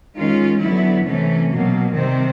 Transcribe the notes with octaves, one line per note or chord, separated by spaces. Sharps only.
D#3 G#3 C#4 F4
D3 F#3 B3 E4
C3 E3 A3 C#4
B2 F#3 A#3
C3 D#3 G3 C4